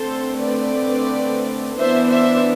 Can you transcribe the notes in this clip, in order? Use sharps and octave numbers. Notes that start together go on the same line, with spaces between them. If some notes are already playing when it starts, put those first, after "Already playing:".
Already playing: D3 A3 C4 A4 C5
B4 D5
E3 B3 D4 C5 E5
C5 E5